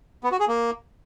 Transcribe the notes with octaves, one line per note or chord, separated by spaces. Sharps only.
B3
F#4
G#4
A#3